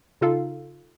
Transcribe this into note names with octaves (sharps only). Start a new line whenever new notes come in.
C#3 D#4 F4 A4 F5